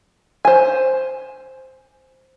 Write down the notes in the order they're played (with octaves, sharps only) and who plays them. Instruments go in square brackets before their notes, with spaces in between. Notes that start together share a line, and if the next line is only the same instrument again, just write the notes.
[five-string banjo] C5 G#5